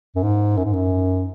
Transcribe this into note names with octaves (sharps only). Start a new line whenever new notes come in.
F#2
G#2
F#2
G#2
F#2